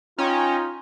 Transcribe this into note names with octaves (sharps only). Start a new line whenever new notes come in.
C#4 D#4 F4 C#5 G5 A#5